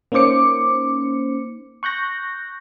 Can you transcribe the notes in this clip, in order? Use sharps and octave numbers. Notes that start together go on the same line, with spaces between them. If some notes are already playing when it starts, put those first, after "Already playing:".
A#3 C#4 D#4 C5 D6 C#7
C#6 F#6 G6 A#6